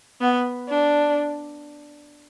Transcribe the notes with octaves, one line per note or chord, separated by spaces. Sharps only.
B3
D4